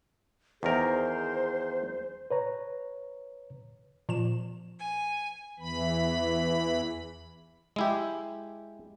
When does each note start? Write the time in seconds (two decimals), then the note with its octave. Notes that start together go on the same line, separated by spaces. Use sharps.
0.63 E2 D#3 G#4 A#4 C5
2.30 B4 C#5 A#5
4.09 A#2 F3 E7
4.79 G#5
5.60 E2 E3 B5
7.76 G#3 E4 G4